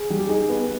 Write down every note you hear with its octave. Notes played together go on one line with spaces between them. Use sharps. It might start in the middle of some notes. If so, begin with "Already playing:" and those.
Already playing: G#4
G3
G4
D#4 G#4
B3